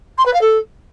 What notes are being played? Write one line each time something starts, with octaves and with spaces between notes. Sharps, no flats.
C6
B4
F5
A4